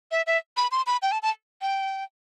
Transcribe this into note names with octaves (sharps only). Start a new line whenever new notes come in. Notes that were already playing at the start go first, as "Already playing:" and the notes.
E5
E5
B5
C6
B5
G5
A5
A5
G5